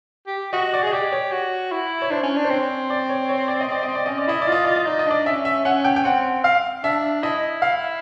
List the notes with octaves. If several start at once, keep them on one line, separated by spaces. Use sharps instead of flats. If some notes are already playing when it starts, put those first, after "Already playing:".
G4
F#4 D#5
D5
G#4 D#5
G4 D5
C#5
F#4
E4
C#5
D4 C5
C#4
D4
C5
C4 C#5
D5
C#5
C#5
D5
D#5
C4 D5
D#5
C4
D5
C#4 D#5
D5
E4 D#5
D5
F4 D#5
F4 D5
D#5
D#4 D5
D#5
D4 D5
C#4 E5
E5
C#4 F#5
G5
G5
C4 F#5
F5
D4 E5
E4 D#5
F5